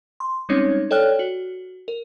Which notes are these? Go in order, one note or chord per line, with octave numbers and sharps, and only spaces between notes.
C6
G3 G#3 C4 C#4 D#4 C#5
A4 C#5 D5 G5 F6 F#6
F#4
A#4